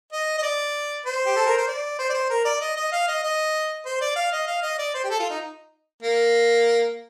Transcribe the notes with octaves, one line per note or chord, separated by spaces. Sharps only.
D#5
D#5
D5
C5
G4
A4
A#4
C5
D5
C5
D5
C5
A#4
D5
D#5
D#5
F5
D#5
D#5
C5
D5
F5
D#5
F5
D#5
D5
C5
G4
A4
F4
D#4
A#3